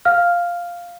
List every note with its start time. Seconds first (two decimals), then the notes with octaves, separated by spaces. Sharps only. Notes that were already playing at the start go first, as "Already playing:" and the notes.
0.05 F5 F6